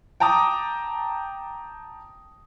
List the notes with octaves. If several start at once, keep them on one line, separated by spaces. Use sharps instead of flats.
G5 A5 A#5 D6 D#6